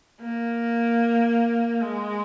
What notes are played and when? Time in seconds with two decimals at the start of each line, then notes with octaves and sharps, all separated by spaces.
0.21 A#3
1.81 G#3